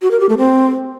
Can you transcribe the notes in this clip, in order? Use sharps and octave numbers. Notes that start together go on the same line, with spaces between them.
F#4
A#4
G4
A3
C4